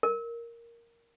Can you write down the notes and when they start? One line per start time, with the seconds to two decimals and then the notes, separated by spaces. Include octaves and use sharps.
0.03 A#4